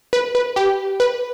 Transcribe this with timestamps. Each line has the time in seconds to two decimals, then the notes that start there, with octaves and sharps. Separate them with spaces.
0.13 B4
0.35 B4
0.56 G4
1.00 B4